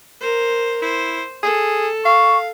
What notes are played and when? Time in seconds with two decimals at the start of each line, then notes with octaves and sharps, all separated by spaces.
0.21 A#4 C5
0.82 E4 C5
1.43 G#4 A4
2.05 F5 C#6